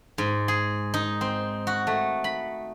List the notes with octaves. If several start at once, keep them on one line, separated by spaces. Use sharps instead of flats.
G#2
G#4
D#4
C4
F#4
A3
B5